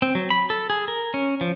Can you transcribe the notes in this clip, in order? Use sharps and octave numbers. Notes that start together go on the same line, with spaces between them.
C4
F#3
B5
A4
G#4
A#4
C#4
F3